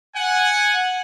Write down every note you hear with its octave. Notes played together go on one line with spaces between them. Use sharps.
F#5 G#5